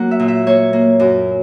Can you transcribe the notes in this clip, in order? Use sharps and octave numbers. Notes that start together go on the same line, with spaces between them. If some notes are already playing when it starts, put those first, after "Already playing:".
Already playing: F#3 A#3 F#5
E5
A#2
E5
A#3 C#5
A#3
F#2